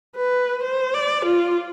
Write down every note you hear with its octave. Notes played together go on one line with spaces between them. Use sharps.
B4
C5
D5
F4